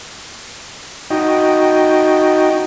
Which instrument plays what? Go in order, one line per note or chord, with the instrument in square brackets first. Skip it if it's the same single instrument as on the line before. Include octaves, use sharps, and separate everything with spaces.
[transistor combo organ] D#4 F#4 D#5 G5